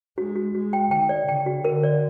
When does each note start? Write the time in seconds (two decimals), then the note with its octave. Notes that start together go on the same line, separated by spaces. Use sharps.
0.17 G#3 F#4
0.35 F#4
0.54 G#3 F#4
0.73 G5
0.91 D#3 G5
1.09 D5
1.28 C#3 G5
1.46 F#4
1.65 D3 A#4
1.83 D5